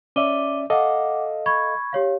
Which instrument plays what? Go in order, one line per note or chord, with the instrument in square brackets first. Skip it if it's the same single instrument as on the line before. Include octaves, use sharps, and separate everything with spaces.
[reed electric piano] C#4 D5 E5 [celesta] D6 D#7 G7
[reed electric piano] A4 D#5 F5 [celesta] F#5 D6
[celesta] B5 C#6 G#6
G4 C#5 F5